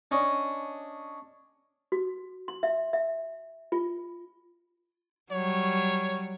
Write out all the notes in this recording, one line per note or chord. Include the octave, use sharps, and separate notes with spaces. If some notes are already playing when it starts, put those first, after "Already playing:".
C#4 D4 D#5
F#4
C6
E5
E5
F4
F#3 G3 C#5